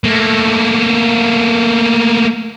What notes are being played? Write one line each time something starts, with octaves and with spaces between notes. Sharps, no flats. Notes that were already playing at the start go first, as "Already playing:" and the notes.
A3 A#3